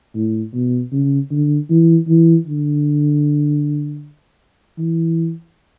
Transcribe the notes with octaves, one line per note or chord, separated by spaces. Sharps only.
A2
B2
C#3
D3
E3
E3
D3
E3